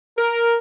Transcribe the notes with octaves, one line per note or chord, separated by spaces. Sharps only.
A#4